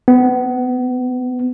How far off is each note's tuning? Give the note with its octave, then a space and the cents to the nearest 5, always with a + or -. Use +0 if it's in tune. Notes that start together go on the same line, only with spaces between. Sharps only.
B3 +30